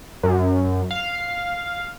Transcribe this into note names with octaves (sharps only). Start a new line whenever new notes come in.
F#2
F5